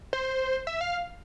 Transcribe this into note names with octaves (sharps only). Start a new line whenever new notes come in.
C5
E5
F5